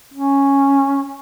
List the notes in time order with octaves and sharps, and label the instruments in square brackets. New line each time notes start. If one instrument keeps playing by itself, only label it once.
[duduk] C#4